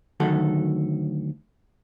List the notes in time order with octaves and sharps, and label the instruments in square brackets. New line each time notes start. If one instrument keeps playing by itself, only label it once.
[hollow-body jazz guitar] D2 D#3 F#3 A4 F#5